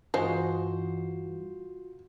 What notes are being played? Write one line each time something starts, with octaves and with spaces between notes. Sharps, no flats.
G2 E3 G#3 D#4 F4 F#4 C5